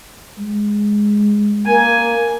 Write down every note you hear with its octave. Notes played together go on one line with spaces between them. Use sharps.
G#3
A#3 G#5